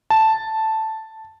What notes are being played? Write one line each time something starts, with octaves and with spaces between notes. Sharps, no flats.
A5